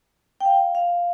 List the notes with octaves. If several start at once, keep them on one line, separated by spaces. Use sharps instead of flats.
G5
F5
F5